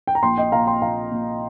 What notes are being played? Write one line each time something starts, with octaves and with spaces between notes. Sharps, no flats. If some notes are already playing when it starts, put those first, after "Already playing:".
G5
A#5
A#1 G5 C6
D#5 G5
A#2 F5 A#5
G5 C6
A#1 F5 A#5
A#2